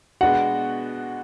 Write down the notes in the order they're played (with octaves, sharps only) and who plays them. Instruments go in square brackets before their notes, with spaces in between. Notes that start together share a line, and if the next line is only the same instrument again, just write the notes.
[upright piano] B2 G#3 B3 D4 F#4 [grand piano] F#5